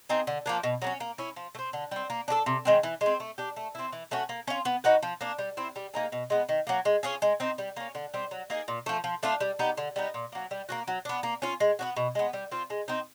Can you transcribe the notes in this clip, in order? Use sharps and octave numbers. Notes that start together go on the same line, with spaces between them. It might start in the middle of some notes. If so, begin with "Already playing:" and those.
C4 D#4 G#4
D3
F3 A#3 D4
B2
F#3 A#3
C#4
A#3
C#4 E4
F3
A3
C4
D3
G3 C4
A#3
D4 F#4 A4
C3
D#3 G#3 C4
E3
G#3
C4
A3
D4 G4
A3
C4 E4
E3
A3 C#4 F#4
A#3
C#4 F4
B3
D#4 F#4 B4
F3
A#3 D4
G3
C4 E4
G3
A#3 D#4 G#4
B2
G#3 B3
D#3
F#3 A#3
G#3
C#4 F4 G#4
G#3
C4 D#4
G3
A#3 C#4
D3
G3 C4
F#3
A#3 D#4 G#4
A#2
F3 A3
F3
A3 D4 F4
G3
B3 D#4 G4
D3
G3 B3 D#4
A#2
F#3 A#3
G3
A#3 C#4 F#4
F#3
B3 D4
A#3
C#4 F4
G#3
B3 D4 F#4
B2
G#3 B3
G3
C4 F4
G#3
C4 D#4